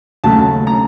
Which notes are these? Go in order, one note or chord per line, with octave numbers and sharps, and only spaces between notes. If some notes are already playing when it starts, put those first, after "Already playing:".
D#2 C#3 F#3 A3 A5
A#5